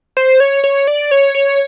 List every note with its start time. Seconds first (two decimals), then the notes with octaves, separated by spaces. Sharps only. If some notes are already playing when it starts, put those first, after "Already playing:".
0.17 C5
0.40 C#5
0.64 C#5
0.87 D5
1.11 C#5
1.35 C#5